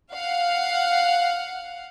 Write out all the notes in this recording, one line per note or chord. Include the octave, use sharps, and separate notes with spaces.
F5 F#5